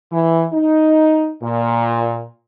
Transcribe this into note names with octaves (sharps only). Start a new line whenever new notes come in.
E3
D#4
A#2